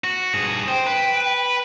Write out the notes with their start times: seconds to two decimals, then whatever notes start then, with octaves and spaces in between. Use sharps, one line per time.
0.04 F#4
0.34 G2 G#4
0.68 C5 G5
0.87 B4